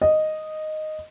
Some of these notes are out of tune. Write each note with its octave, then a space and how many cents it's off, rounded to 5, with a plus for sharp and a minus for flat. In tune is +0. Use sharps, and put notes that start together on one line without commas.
D#5 -5